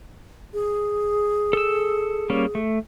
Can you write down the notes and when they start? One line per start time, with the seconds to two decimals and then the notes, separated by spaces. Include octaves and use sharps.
0.53 G#4
1.53 A4 E6
2.30 G3 A#3 C#4
2.55 A3